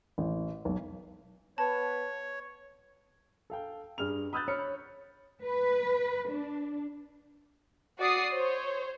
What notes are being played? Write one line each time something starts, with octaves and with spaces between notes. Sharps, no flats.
A1
B1
B3 B4 C#5 A5
A4 F5 G5
G2 G#4 F6 F7
B5 D#6 E6 F#6 G6 A6
C#5 B5 F6 C#7
B4
D4
F#4 D5 D#6 C7
C5 C#5